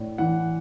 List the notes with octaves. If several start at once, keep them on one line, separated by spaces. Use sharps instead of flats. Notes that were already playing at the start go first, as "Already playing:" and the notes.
Already playing: A2 D4
E3 F#5